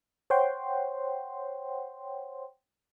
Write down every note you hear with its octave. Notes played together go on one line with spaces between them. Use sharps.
C5 C#5 F#5 G5 C6